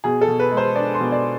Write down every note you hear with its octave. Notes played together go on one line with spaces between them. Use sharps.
B2 G#4
A4
B2
B4
G#3
C5
D4 D5
C6
B2
D5